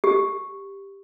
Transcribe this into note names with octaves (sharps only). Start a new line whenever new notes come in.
G4